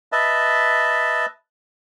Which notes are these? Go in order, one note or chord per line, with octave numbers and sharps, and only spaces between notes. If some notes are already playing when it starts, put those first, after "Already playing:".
B4 D#5 E5 A5